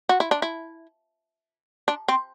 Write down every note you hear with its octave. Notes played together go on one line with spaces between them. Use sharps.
F#4
E4
D4
E4
D4
C4